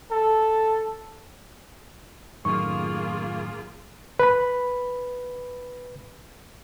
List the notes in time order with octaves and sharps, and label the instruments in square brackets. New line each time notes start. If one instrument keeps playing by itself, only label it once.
[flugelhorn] A4
[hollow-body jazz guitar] F#2 A2 D#3 [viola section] A#3 F4 G#4 [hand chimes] C#6
[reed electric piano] B4 B5